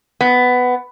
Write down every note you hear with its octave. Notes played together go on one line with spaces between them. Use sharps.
B3